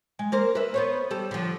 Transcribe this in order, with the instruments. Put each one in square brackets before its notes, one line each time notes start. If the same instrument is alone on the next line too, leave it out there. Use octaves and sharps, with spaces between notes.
[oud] G#3
A#3 A#4 C5
B4 E5
B3 C5 C#5
G3 A4
D3 F3